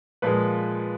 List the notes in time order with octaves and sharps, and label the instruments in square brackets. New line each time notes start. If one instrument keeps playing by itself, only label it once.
[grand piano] A#2 F3 G#3 B4